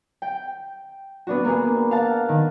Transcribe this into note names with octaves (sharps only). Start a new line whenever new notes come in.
G5
B3 D4 F#4
A#3 B3 G#4
F5 F#5 A5
D#3